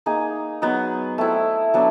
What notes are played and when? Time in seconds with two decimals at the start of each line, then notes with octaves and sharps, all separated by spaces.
0.06 A#3 D#4 G#4
0.62 F#3 B3 D#4
1.18 A3 C4 E4
1.74 F#3 B3 D4